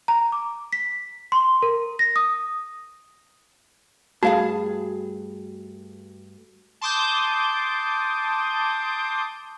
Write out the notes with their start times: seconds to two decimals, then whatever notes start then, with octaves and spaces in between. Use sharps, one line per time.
0.08 A#5
0.32 D6
0.73 B6
1.32 C6
1.63 A#4
1.99 A#6
2.16 D#6
4.23 G2 A3 F#4 G#4 F5 A5
6.81 A5 C6 D6 D#6 G6